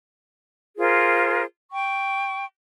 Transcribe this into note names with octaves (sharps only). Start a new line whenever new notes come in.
F4 G#4 A#4 C5
G5 C#6